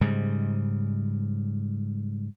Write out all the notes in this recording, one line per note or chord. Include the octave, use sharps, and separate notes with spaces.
G#2 C#3 G3